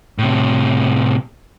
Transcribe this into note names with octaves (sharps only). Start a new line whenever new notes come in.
A2 C3